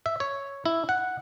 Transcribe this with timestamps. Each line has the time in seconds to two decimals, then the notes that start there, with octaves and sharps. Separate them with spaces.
0.06 E5
0.20 C#5
0.65 E4
0.89 F#5